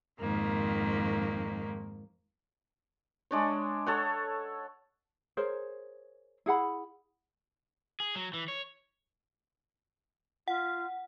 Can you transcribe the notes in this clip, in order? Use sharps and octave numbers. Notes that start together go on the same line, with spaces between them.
F2 G#2 D#3 A#3
G#3 D4 C#5
A4 C#5 F#5
G#4 A#4 C5 C#5
E4 G#4 F#5 B5
G#4
F#3
E3
C#5
F4 F#5